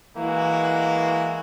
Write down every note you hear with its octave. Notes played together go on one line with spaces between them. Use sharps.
E3 G#3 A#3 E4 F#4